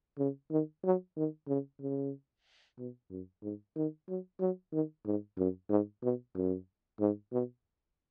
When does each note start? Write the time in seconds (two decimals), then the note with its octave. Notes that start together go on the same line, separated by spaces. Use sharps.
0.19 C#3
0.51 D#3
0.84 F#3
1.17 D#3
1.48 C#3
1.81 C#3
2.78 B2
3.11 F#2
3.42 G#2
3.76 D#3
4.08 F#3
4.40 F#3
4.72 D#3
5.06 G#2
5.38 F#2
5.70 G#2
6.03 B2
6.35 F#2
7.00 G#2
7.32 B2